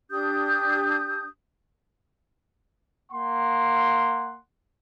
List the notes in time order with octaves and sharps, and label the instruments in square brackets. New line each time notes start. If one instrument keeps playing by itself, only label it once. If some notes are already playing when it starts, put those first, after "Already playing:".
[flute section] D4 G4 D#6 G6
[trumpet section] A#3 F#5 C6